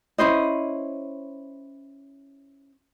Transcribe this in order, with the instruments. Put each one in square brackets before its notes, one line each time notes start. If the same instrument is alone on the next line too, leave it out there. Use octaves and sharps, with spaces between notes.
[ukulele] C#4 E4 C5 D#5